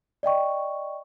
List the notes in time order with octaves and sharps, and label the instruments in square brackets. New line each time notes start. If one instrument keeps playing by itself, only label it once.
[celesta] D5 D#5 G5 C#6